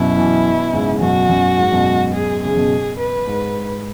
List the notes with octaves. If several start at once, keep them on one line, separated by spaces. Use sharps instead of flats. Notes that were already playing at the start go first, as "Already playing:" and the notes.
Already playing: F#2 B2 E4
B2 E3
G#2 C#3
F#2 B2 F#4
F#2
G#2
F#2 B2
G#4
C#3 G#4
F#2 B2
B4
G#2